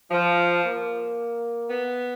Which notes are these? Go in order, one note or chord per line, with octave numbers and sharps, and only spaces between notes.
F3
A#3
B3